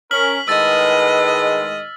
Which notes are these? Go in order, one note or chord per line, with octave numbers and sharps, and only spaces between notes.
C#4 A#4 F6 B6 F#7
A2 D#3 G#3 B4 D#5 E6 A6